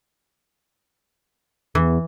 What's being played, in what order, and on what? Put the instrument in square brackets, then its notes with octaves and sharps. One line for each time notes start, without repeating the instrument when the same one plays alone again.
[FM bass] E2 [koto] E3